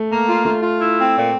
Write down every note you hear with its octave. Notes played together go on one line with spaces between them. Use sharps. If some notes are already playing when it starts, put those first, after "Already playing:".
Already playing: A3
A#3
F4
A3 F4
F4
E4
C4
A#2